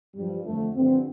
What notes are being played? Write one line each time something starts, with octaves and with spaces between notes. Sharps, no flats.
G2 F3 G3
F2 D3 F3 A3
G2 D3 F3 C4